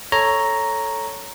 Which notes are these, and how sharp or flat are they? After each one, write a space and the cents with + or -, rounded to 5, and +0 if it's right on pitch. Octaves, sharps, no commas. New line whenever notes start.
A4 +0 C#5 +0 A#5 +0